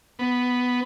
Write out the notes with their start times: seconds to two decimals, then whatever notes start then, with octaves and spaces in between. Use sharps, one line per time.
0.19 B3